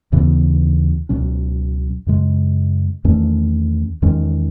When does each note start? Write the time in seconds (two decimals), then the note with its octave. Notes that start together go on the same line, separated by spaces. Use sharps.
0.12 D#2 C#3 E3 B3
1.09 C#2 B2 F#3 C#4
2.07 F#2 C#3 G#3
3.04 E2 D#3 A3 C#4
4.02 E2 D#3 G#3 C#4